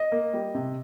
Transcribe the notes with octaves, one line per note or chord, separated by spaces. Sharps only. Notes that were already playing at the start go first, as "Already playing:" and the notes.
Already playing: D#5
A#3
G3
C3